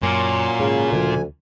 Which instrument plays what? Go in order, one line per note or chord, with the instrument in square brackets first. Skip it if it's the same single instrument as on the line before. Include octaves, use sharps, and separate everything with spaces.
[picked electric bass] F#2 [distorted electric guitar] A#2 [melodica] F#3 C#4 C6
[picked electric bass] G#2 [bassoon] C#3
[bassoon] D2 [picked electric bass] C#3 E3 F3 [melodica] G#5